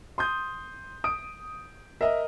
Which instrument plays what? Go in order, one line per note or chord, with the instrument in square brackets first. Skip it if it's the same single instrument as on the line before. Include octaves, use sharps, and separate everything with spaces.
[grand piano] C6 D#6 G6
[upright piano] D#6 [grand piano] D7
[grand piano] A#4 D#5 [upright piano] E5